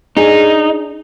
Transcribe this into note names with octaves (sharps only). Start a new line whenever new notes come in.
D4 D#4 G#4